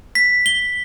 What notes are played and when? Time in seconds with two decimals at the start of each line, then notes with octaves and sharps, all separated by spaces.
0.15 B6
0.46 G7